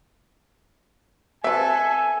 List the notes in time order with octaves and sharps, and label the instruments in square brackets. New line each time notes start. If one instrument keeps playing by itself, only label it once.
[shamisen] C4 B4 [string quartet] A4 [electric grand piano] E5 [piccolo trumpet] G#5